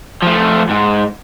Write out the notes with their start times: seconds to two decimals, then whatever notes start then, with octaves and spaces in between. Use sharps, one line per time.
0.22 F3 A3
0.69 G#2